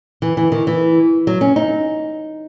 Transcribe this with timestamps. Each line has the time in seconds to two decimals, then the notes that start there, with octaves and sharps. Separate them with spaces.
0.22 E3
0.37 E3
0.52 D#3
0.67 E3
1.27 F#3
1.41 C#4
1.56 D#4